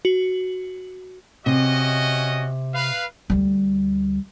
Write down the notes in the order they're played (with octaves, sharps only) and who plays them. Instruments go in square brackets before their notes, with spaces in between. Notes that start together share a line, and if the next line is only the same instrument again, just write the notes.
[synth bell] F#4
[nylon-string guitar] C3 [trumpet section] C#4 F#4 D#5
[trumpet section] B4 F5
[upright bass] D2 G3